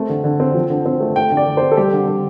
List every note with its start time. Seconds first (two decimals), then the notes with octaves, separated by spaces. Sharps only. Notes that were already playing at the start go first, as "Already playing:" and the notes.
Already playing: A3 C4
0.09 D3
0.24 D3
0.40 C4
0.54 F3
0.70 D3
0.86 C4
1.00 A3
1.16 A3 G5
1.31 D3
1.37 D5
1.47 D3
1.57 C4 C5
1.71 A4
1.77 G3 G4
1.93 D3
2.08 D3